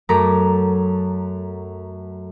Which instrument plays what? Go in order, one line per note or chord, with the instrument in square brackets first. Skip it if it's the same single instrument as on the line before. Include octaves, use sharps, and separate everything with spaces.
[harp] F#2 A3 A#5 D6 B6